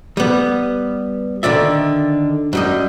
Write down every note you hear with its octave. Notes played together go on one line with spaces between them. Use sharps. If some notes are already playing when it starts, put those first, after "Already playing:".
G3 B3
D3 D#3 D5 E5
F#2 G3 D#5